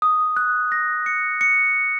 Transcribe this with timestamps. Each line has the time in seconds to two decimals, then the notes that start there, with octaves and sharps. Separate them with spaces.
0.02 D#6
0.37 F#6
0.72 A#6
1.06 C#7
1.41 C#7